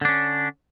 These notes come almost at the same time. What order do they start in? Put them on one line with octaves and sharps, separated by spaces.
D3 D4 C#4